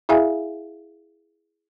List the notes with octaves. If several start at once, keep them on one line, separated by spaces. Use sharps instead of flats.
E4 G#4 E5 F5 G#5